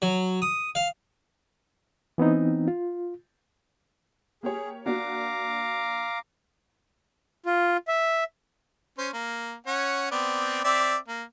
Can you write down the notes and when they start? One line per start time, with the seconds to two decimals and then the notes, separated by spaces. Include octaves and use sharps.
0.02 F#3
0.42 D#6
0.75 F5
2.18 E3 B3 C4 D#4
2.68 F4
4.43 A#3 G4 G#4 C#5
4.86 A#3 D4 F#4 F5 A#5 D6
7.46 F4
7.88 E5
8.98 C#4 C5
9.13 A#3
9.67 C#4 C#5 F#5
10.11 B3 C4 D5
10.64 C4 D5 E5
11.08 A#3